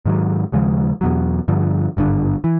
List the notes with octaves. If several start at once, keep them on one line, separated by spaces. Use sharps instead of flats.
G#2 D#3 F#3
D#2 C#3 F3 G#3
E2 B2 F#3
G2 D3 F3
G#1 G2 D3
E3